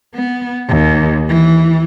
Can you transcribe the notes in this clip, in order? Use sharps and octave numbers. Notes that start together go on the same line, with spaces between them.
B3
D#2
E3